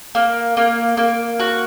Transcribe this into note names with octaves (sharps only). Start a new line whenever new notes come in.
A#3
A#3
A#3
F#4